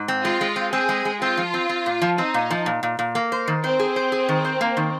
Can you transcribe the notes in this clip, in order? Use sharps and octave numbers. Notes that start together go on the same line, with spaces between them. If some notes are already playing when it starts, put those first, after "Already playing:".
Already playing: G#2
C4
G#3 F4
G#3
C4
C4 G#4
G#3
G#3
C4 F4
F3
C4
C4
A#2
F3
C4 D#4
A#2
F3
A#2
A#2
A#2
A#3
C5
D#3
C4 C5
G#4
C5
G#4
D#3
C5
A#3
D#3